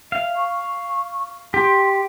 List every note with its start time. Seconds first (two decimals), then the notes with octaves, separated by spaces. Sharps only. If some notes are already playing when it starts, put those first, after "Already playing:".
0.12 E5 F5
0.36 C#6
1.54 G4 C6